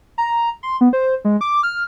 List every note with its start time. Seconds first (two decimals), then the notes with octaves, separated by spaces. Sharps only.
0.18 A#5
0.63 C6
0.81 B3
0.93 C5
1.25 G#3
1.41 D6
1.63 F6